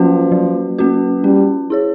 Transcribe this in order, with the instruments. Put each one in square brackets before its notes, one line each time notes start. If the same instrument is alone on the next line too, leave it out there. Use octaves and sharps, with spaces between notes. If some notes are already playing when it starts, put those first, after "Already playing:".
Already playing: [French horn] F3 [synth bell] F#3 A#3 C#4 F#4 B4
[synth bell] F#3
A#3 C#4 F#4 B4
[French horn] G3 [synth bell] C#4
[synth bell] E4 G#4 C#5